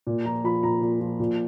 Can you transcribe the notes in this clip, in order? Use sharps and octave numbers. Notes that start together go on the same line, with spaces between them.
A#2
F3 A#5
F3 B5
A#2 A#5
A#2
F3
A#2